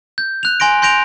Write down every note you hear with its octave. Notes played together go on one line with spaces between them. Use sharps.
G6
F#6 F7
G#5 C6 A#6 D7
C6 G6 A#6 D7 F7